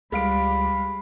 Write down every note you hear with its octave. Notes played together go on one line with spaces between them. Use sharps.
C#2 G3 G#3 F5 B5 D7